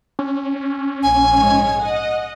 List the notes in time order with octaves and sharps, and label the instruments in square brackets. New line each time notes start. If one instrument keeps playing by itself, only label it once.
[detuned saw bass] C#4
C#4
[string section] A#1 [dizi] G#5
[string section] G#2 G#3 C#5
D#5 F#5